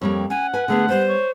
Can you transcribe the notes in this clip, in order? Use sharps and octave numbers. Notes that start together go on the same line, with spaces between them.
F2 G3 A#3 C#5
C#4 F#5 G#5
B4 G#5
D3 A3 B3 G#4
G3 B3 C5
C#5